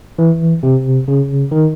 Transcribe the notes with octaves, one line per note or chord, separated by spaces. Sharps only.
E3
C3
C#3
D#3